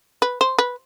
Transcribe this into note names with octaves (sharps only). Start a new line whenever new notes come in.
B4
C5
B4